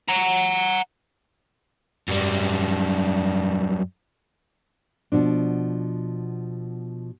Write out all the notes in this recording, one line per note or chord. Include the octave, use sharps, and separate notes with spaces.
F#5 A#5
F#2 G3
B2 F3 D4